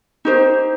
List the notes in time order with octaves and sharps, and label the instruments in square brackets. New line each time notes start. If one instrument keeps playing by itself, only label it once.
[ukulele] D#4 G4 C5